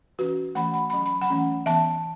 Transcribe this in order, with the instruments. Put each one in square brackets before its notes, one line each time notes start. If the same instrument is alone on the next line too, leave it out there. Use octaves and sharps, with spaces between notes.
[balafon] E3 C#4 F#4 B4
E3 A3 C#4 F#5 B5
B5
B5
F#3 C#4
B5
F#5 B5
E3 A3 C#4
E3 B3 E5 A5